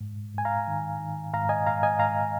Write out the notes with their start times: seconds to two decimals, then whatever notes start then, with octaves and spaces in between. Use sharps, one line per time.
0.01 G#2
0.34 G#2 G#5
0.45 F5 A#5
0.68 D#3
1.00 D#3
1.33 G#2 F5 A#5
1.49 D#5 G#5
1.66 G#2 F5 A#5
1.83 D#5 G#5
1.99 G#2 F5 A#5